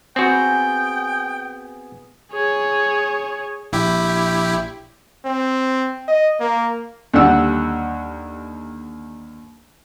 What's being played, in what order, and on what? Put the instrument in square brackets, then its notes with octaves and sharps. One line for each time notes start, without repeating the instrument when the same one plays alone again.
[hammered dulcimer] B3 G#4 [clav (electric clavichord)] C4 F#4 [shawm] G5
[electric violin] G#4 C#5
[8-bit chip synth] A#1 E4 G4
[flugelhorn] C4
D#5
A#3
[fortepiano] D#2 D3 G3 F#5 E6